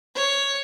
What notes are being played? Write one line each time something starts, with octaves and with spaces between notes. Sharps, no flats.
C#5